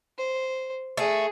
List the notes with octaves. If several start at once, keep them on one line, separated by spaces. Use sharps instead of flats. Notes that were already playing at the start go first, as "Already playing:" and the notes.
C5
A3 G#4